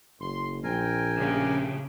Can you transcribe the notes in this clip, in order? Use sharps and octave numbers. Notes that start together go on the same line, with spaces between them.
F#1 C6
A#1 C4 A#4 G5 G#5
C#3 A3 F4 G4